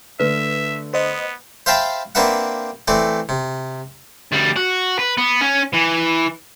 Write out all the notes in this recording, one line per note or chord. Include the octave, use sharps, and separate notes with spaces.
D3 A3 B4 E5
B3 C5 D#5
C5 E5 F5 G5 A5 B5
A#3 C4 D4 B4 E5 F#5
E3 A3 C4 D5
C3
D2 G3
F#4
B4
B3
C#4
E3